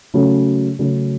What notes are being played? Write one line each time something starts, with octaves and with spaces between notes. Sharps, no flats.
C#3 F#3 A3 C#4
C#3 F#3 A3 C#4